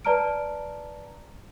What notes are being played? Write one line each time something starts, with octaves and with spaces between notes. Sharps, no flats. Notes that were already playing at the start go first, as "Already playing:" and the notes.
B4 D5 A5 A#5 F6 D7